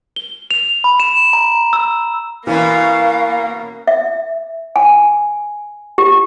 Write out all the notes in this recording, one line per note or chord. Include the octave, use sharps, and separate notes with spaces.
G7
F7
B5
E7
A#5
E6
B2 E3 A#3 C#4 E4 F5
E5
G#5
G4